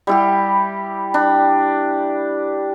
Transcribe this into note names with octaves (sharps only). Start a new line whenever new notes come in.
G3 E4 G4
D4